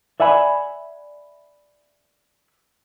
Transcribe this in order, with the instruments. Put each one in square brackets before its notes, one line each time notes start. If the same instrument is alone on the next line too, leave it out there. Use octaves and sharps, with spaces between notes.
[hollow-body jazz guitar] D5 E5 F#5 G#5 B5